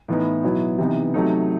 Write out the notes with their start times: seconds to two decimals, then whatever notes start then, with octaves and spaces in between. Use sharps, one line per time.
0.08 A2 E3 B3 D#4
0.43 B2 F#3 B3 E4
0.78 C3 E3 B3 D#4
1.14 C3 F#3 A3 D#4